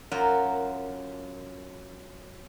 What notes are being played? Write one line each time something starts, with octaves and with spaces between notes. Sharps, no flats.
F#2 F4 F#4 A#4